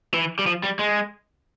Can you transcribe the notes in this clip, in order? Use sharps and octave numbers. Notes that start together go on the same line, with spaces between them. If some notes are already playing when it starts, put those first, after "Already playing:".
E3
G3
F3
G3
G#3